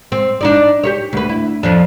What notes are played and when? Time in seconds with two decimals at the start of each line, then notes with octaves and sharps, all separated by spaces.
0.12 C4
0.41 D4 D#4 D5
0.84 G4 A#4 C#5
1.13 D2 B4
1.29 E4
1.63 F2 F3 D4